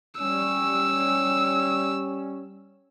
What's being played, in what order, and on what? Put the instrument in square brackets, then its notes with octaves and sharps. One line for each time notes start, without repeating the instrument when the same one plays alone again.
[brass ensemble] G3 C#4 [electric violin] E6